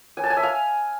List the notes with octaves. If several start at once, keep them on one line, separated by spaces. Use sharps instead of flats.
G#5
A5
G#5
E5
F5